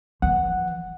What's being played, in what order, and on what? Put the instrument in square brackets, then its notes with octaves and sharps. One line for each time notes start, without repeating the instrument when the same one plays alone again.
[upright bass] E3 F3 [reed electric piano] F#5